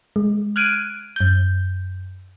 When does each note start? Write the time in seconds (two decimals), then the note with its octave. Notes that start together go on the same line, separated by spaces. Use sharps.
0.16 G#3
0.56 F6 F#6 G#6 D7 D#7
1.16 F#2 G6